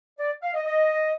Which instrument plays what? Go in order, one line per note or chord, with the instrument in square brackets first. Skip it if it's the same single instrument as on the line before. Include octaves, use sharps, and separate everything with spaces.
[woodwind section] D5
F5
D#5
D#5